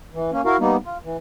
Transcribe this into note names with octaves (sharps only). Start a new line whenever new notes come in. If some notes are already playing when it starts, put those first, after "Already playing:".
E3
A#3 C#4
E4 F#4 A#4 F5
G3 A#3 B3 D#4
F4
E3